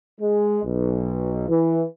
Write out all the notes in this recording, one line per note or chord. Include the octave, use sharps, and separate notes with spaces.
G#3
B1
E3